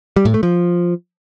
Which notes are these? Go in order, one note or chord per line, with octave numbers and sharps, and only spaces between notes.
G3
A2
A3
F3